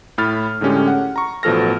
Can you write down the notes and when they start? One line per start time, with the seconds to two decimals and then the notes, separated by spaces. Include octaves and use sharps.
0.18 A2 B5 F6 A6
0.61 A2 D3 G#3 C#4 G4
0.88 F#5
1.16 A#5 C#6
1.43 A1 B2 F3 A4 F6 A#6